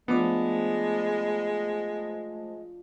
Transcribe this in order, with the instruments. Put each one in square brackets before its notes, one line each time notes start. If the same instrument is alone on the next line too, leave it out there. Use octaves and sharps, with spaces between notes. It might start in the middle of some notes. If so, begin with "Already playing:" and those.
[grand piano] F3 D4 D6 [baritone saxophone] G#3 [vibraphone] A3 C5 A5 [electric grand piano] B3